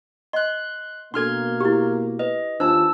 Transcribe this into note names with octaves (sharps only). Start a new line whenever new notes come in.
D#5 C6 F#6
B2 A#3 D4 A4 C6 F6 G#6
E4 G4
B4 D#5
D#2 D4 F4 C5 A5 E6